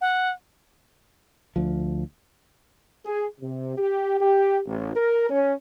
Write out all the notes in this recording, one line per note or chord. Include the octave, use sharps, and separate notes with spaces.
F#5
D2 F3
G#4
C3
G4
G4
A1
A#4
C#4